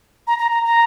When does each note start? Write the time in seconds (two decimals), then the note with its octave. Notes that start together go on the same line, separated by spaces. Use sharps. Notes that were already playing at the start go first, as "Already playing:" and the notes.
0.27 A#5
0.39 A#5
0.51 A#5
0.64 A#5